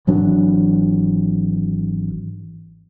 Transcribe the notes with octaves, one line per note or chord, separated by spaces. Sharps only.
G#1 E3 F#3 D4